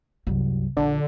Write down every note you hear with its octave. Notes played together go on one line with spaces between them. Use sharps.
C2 F#2
A#1 D3